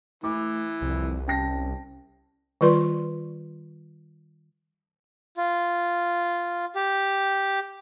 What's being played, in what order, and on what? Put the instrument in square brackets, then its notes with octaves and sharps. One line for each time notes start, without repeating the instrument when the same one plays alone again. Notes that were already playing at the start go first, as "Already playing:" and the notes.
[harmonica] E3 [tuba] A3 [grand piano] D6
[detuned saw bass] C2 [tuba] F2
[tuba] C#4 [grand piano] G5 A5 A#6
[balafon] D#3 G3 F4 B4 D5 C6
[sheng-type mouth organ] F4
G4